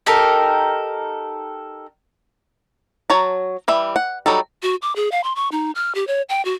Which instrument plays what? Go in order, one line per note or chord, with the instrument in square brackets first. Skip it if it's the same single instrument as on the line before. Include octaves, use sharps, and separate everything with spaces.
[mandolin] D#4 G4 A4 A#4
[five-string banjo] F#3 C#5 A5 A#5
E3 G3 E5
F#5
F#3 G3 D#4 A4
[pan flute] F#4
D6
G#4
F5
C6
C#6
D#4
F6
G4
C#5
G5
F#4